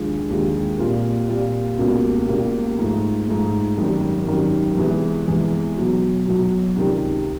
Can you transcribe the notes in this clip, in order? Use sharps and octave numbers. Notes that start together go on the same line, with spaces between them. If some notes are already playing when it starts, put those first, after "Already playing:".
Already playing: D#2 D3 F3 G#3
D#2 D3 F3 G#3
A#2 G3 C4 F4
A#2 G3 C4 F4
C#2 B2 G3 A#3
C#2 B2 G3 A#3
G#2 F3 A3
G#2 F3 A3
G#1 F#2 D#3 G3
G#1 F#2 D#3 G3
E2 C3 E3 G#3
E2 C3 E3 G#3
B1 B2 F#3
B1 B2 F#3
C#2 C3 D#3 G3